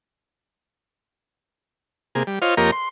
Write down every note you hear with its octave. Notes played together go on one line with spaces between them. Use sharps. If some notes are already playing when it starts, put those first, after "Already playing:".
C3 A#3 G#4
G3
F4 C5 C#5 D#5 F5
F2 A#3 G4 A#4 C#5 D#5
C6